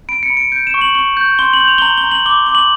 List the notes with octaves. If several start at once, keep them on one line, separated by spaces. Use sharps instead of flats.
B5 D7
C#7
B5
D7
G6 D7
E7
C#6
F#7
C#6 F#7
G6
C6 G7
F#7
G6
F7
G7
A#5 F#7
G7
A#5
F#7
D6 G7
D6 G7
F#7